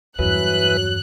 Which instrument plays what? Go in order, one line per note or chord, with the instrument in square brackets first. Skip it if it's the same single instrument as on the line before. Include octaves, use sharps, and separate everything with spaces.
[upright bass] E2 G2 [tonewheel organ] E3 B4 [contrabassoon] F#3 [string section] F#6